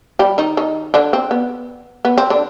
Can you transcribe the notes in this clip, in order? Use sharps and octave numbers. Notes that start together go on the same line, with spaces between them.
G3 G4
D#3 D#4
D#3 D#4
D3 D4
C4
B3
B3
C4
D3 D4